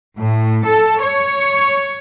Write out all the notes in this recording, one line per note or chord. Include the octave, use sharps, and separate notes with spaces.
A2
A4
C#5